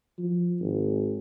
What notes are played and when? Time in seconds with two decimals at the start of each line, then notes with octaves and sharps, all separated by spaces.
0.19 F3
0.61 G#1